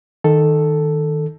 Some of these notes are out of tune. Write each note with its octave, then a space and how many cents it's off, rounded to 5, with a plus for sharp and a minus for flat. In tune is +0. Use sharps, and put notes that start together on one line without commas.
D#3 +0 A4 +0